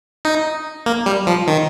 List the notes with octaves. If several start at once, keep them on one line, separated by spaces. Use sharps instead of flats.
D#4
A#3
G3
F3
D#3